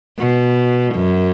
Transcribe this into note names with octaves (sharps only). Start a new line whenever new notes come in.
B2
F#2